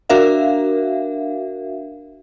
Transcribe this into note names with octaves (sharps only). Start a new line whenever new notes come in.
D4 F#4 A#4 E5 F5